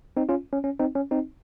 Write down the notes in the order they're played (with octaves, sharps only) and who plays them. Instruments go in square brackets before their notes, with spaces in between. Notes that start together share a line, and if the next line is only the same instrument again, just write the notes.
[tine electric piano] C4 D#4
C#4 F4
C#4
C#4
C4 D#4
C#4
C4 D#4